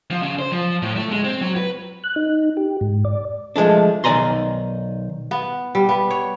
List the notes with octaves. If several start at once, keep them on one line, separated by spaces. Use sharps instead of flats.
F3
C#3
C5
F3
A2
A3
G#3
C4
F#3
B4
F#6
D#4
G4
G#2
D5
F3 G#3 A3 D4
B1 D#3 D5 G#5 A#5 C6
B3
G3
B3
C#5